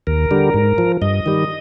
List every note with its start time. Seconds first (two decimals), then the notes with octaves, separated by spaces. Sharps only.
0.07 D#2 A#4
0.31 D3 G3
0.54 G#2
0.78 F3
1.02 G2 D#5
1.26 D#3 G3